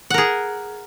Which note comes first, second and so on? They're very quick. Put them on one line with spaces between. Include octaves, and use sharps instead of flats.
F#5 A#4 G#4